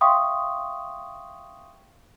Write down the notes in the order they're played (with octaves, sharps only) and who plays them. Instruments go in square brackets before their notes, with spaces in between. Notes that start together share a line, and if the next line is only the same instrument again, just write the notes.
[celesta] E5 F5 G5 C6 C#6 D#6